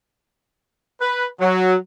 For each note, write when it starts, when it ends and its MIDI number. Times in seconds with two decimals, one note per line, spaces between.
1.01 1.26 71
1.41 1.75 54